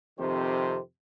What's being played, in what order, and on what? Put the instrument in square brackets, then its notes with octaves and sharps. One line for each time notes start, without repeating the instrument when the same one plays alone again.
[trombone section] F2 C3 D#3 G4 C5